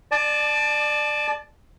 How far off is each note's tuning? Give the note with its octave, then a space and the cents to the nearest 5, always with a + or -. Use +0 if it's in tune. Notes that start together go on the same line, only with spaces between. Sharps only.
D5 +20 A5 -25